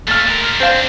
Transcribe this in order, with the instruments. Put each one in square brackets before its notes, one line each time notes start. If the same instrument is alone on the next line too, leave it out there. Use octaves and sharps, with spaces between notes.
[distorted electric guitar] A#2 A3 [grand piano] F6 A6
[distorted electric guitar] G#3 A#4
[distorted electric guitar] C4 D4 [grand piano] C5 F5